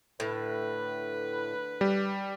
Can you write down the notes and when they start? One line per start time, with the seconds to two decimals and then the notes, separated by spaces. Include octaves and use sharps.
0.20 A2 D3 B4
1.81 G3